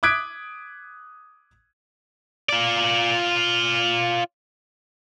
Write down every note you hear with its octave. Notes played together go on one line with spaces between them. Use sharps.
D6 D#6 F#6 G#6 B6 D7
F4 D5